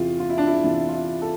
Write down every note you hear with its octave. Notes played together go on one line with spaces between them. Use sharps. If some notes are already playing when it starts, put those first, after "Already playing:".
Already playing: E2 C3 E3 F4
F4
E4
D4
E4
E2 C3 E3 D4
F4
E4
A4